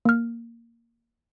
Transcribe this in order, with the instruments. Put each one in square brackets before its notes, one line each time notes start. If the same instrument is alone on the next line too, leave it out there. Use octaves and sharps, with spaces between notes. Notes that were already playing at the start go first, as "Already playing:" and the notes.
[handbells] A#3 F6